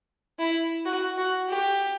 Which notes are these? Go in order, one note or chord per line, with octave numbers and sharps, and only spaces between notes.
E4
F#4
F#4
G4